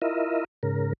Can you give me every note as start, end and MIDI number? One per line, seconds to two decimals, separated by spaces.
0.02 0.45 64
0.02 0.45 65
0.02 0.45 70
0.02 0.45 75
0.02 0.45 76
0.63 0.93 44
0.63 0.93 49
0.63 0.93 70